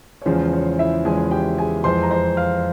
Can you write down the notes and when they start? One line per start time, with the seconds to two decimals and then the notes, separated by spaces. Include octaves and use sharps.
0.22 C#5
0.26 E2 C#3 F3 G#3 C5
0.53 C#5
0.79 E4 E5
1.05 E2 C#3 F3 G#3 G#4 G#5
1.31 G4 G5
1.58 G#4 G#5
1.84 F2 E3 G#3 C5 C6
2.03 A#5
2.11 C5 C6
2.37 F5 F6